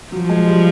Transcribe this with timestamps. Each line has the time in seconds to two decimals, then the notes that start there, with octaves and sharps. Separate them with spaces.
0.12 F3 F#3
0.29 G#3
0.47 G3